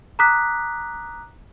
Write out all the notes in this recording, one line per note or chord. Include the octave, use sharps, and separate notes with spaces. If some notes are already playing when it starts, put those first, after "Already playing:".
A#5 D6 D#6 F#6 B6